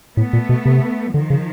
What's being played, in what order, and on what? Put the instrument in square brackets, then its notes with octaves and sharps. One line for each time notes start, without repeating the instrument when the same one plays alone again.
[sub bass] A2 [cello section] A3 B3
[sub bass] A#2
B2
C3
[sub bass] D3 [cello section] D#3 F3
[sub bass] C#3